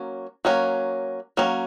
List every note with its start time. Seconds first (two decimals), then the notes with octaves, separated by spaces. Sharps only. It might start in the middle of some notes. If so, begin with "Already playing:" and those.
Already playing: F#3 A#3 C#4
0.45 F#3 A#3 C#4
1.37 F#3 A#3 C#4